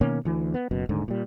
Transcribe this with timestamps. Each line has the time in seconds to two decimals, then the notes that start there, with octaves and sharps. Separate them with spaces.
0.01 B2 D#3 A#3 C#4
0.25 D2 E3
0.54 B3
0.71 F#1 F#2 B2
0.89 D#1 G#2 D3
1.08 A#2 G3